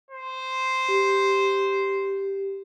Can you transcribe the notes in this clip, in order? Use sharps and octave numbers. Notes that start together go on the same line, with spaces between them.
C5
G4